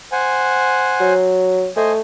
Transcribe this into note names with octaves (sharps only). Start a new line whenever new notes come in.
C5 F#5 G#5
F#3
A3 C5 D#5 G#5